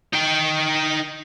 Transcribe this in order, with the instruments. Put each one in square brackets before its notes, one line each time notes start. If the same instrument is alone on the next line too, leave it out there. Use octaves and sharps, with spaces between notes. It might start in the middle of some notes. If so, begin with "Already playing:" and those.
[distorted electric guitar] D#4 G5